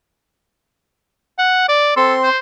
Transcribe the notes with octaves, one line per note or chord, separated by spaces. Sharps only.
F#5
D5
C4 A4 C6
C5